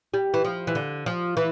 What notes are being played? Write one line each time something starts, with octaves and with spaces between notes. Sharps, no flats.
G3
E3
F3
E3
D3
F3
E3